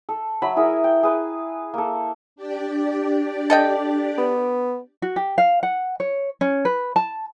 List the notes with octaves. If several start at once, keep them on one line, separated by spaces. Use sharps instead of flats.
A4
F#3 E5 B5
E4 G#4 A#4
G5
G#4 B4
A#3 A4
D4 G4 D5
A4 D#5 G5
B3
F#4
G4
F5
F#5
C#5
C#4
B4
A5